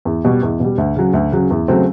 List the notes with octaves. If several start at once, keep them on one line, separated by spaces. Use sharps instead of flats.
E2
B2 G3
E2
B2 G3
D2
C#3 F#3
D2
C#3 F#3
E2
C#3 F#3 A3 C4